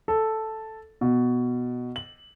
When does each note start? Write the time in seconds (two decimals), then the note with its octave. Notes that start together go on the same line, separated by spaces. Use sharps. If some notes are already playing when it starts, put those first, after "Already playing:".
0.08 A4
1.01 B2
1.96 F#7